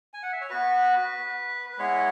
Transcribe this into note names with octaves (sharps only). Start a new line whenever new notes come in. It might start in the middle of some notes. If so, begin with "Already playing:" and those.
G#5
F#5
E5
C#5
B3 F#4 B4
B4
G#3 B3 E4 G#4 C#5